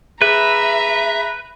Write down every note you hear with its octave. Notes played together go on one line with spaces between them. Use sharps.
G#4 B4 E5 A#5 B5